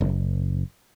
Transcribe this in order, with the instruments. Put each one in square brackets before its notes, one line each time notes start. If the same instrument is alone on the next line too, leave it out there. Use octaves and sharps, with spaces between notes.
[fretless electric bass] F#1